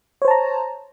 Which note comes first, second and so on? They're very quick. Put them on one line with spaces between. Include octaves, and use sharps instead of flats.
C#5 C5 A5 A#5